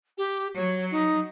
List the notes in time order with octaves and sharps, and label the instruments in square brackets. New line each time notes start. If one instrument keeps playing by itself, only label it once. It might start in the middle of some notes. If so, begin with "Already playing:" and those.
[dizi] G4
[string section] F#3 [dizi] C#5
[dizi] D#4